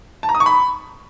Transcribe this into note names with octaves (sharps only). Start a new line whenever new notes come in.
A5
A#5
D#6
C#6
B5